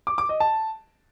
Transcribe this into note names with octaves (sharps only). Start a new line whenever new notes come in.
D6
D6
D#5
A5